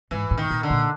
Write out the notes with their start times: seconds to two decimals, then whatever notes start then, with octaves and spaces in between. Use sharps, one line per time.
0.11 G#2 E3
0.31 A2
0.38 D#3
0.50 A#2
0.63 D3
0.70 A#2